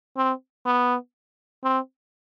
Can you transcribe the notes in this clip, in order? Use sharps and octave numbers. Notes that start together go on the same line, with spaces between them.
C4
B3
C4